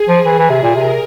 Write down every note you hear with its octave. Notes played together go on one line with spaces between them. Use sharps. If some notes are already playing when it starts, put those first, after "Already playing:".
Already playing: G#4
F3
E3
E3
C3
A#2
C3 A#4